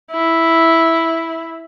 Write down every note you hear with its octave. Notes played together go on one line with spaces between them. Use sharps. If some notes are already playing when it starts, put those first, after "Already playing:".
E4